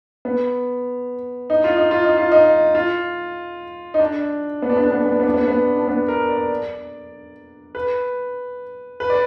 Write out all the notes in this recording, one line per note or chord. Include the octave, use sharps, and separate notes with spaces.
B3
D#4
F4
D#4
F4
D#4
F4
D#4
F4
D#4
D4
B3
D4
B3
D4
B3
D4
B3
D4
B3
D4
B3
D4
B3
D4
B3
A#4
D5
B4
B4
D5